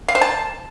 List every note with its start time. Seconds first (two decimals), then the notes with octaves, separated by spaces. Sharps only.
0.08 F5
0.15 C5
0.21 A5